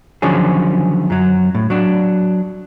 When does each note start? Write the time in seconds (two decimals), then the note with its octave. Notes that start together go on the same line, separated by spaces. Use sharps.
0.22 D3 D#3 F3 F#3 C#4 G#4
1.10 F#2 F#3
1.55 A2
1.70 F#3 D4